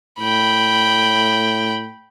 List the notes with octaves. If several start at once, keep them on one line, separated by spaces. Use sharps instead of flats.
A2 G5 B5